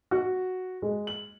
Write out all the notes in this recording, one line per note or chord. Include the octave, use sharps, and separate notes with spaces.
F#4
G#3
F#7